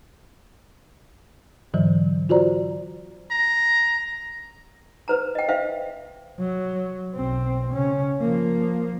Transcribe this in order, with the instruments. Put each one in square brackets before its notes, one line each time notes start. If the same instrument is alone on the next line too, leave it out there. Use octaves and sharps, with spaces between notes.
[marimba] G#2 D3 E3 F#3
F4 F#4 C5 D5 A#5
[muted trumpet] A#5
[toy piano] B4 C5 A#5
D#5 G5
C5 E5 F5 G5
[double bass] F#3
B1 C4
C#3 C#4
F3 A#3